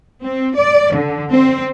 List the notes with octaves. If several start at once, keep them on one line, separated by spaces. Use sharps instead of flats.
C4
D5
D3
C4